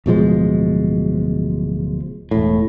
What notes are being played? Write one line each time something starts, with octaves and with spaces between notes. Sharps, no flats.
D1 B2 F3 G#3
E1 A2